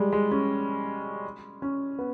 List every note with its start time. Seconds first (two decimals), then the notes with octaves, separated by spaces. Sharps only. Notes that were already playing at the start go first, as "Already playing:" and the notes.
Already playing: G3 G#3
0.13 G#3
0.31 C#4
1.62 C#4
1.99 B3